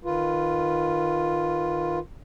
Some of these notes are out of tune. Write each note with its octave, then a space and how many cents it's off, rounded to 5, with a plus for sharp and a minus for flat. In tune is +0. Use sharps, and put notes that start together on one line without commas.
D#3 -15 F4 +0 B4 -5